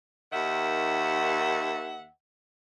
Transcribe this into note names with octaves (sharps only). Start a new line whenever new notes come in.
D#2 D#3 E5 F#5